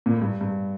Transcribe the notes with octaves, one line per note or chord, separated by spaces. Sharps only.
A#2
A2
G2
G2